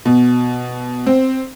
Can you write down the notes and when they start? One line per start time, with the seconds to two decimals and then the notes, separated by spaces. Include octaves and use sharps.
0.06 B2
1.07 C4